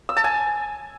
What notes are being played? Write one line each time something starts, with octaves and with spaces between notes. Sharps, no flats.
E6
A5
G#5